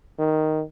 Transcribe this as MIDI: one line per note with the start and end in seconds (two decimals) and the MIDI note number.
0.19 0.63 51